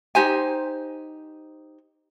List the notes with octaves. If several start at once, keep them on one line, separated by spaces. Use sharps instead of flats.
D#4 G4 C5 G#5